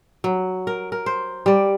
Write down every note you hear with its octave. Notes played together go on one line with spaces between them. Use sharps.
F#3
A#4
A#4
C5
G3 D5